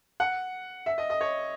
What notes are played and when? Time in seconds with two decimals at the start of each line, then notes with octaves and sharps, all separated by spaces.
0.20 F#5
0.86 E5
0.98 D#5
1.10 D#5
1.21 C#5